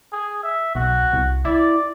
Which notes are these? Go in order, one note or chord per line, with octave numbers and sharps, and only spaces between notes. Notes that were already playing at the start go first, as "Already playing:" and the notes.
G#4
E5
B1 F#4
C2
E4 D5